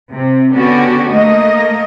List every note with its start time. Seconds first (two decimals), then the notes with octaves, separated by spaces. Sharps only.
0.12 C3
0.53 D3 B3 C#4 F#4 G4
1.09 A3 A#3 D#5